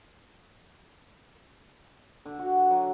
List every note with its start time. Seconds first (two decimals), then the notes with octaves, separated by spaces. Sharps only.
2.25 D3
2.39 F#4
2.70 F#3